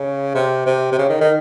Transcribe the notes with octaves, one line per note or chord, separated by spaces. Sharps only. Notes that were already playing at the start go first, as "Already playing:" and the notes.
Already playing: C#3
C3
C3
C3
C#3
D#3
D#3